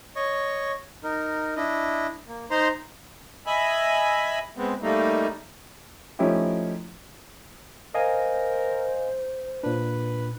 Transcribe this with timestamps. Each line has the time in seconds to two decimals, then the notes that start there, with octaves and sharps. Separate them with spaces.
0.16 C#5 D#5 C#6
1.04 D#4 A#4
1.56 D4 E4 D#5
2.27 A#3
2.50 D#4 C5 A#5 C6
3.47 D#5 E5 G#5 B5
4.57 G#3 B3 C4
4.82 G3 A3 A#3 D#4
6.19 F3 A3 C#4 D#4 E4 G4
7.95 A#4 C5 D#5 F5 G#5
9.63 A#2 D4 B4